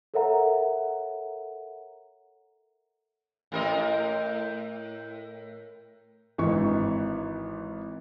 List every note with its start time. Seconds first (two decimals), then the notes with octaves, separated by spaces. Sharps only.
0.14 A4 A#4 C#5 E5 F#5 A#5
3.52 A2 A#4 D#5
6.38 G#1 E3 D#4 C#6